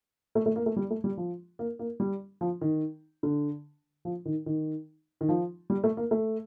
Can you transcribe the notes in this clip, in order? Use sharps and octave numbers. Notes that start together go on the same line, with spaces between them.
A3
A3
A#3
A3
G3
A3
G3
F3
A#3
A#3
G3
F3
D#3
D3
F3
D#3
D#3
D#3
F3
G3
A3
A#3
A3